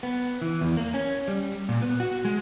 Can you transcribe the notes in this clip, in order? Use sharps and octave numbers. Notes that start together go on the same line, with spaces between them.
B3
E3
E2
A#3
C#4
G3
A#2
B3
F#4
G#3